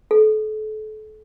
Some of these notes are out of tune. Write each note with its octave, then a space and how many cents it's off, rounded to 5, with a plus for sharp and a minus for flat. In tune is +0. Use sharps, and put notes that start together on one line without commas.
A4 -35